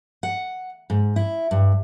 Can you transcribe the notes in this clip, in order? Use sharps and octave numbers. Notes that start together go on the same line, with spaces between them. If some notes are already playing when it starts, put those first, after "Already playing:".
F#5
G#2
E4
G2